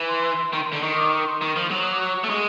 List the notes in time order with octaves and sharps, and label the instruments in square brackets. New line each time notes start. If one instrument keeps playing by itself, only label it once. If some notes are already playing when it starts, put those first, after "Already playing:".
Already playing: [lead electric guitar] E3
[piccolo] C6
[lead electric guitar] D#3
D3
[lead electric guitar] D#3 [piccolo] C#6
[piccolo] D6
C#6
C6
[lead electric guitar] D#3 [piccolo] C#6
[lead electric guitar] F3
F#3
[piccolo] D#6
D6
C#6
[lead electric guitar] A3
G#3